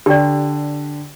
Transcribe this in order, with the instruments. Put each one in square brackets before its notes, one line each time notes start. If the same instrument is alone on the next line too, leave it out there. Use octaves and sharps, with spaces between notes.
[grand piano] D3 G5 [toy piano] G4 D5